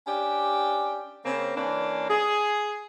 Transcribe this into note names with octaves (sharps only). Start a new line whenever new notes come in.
C#4 D4 G4
C#3 A#3 C4
E3 A#3 C#4 D4
G#4